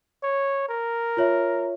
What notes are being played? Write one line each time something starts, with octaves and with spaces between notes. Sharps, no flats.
C#5
A#4
F4 C#5 E5